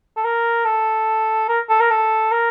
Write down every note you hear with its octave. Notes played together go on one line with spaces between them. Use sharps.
A4
A#4
A4
A#4
A4
A#4
A4
A#4